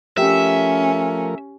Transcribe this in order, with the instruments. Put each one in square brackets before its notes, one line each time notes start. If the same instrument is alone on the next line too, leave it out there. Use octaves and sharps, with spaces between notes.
[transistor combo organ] F3 A3 A#4 [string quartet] C#4 [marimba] G4 G5 [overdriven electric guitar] E5